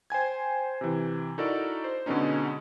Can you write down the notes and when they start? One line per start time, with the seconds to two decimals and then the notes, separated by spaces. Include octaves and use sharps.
0.10 C5 G5 G#5 G#6
0.81 C3 E3
1.38 D#4 E4 F#4 A4 A#4 D5
1.84 C5
2.06 B2 D3 G#3 B3 C#4 D#4